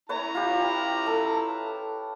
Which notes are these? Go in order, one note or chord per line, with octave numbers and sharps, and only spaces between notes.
E4 B4 C#5 G#5 A#5
F4 G4
A4